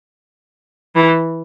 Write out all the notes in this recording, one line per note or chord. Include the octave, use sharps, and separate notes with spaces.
E3